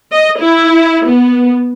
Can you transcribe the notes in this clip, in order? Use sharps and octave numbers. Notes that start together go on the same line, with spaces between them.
D#5
E4
B3